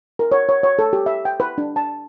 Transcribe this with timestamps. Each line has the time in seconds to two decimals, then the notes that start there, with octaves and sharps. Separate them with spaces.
0.19 A#4
0.32 C#5
0.49 C#5
0.63 C#5
0.79 A4
0.93 G4
1.06 E5
1.25 G5
1.40 B4
1.58 D4
1.76 A5